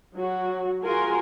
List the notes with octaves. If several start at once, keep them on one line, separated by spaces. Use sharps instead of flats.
F#3 F#4
F4 F#4 G#4 A#4 G#5 C6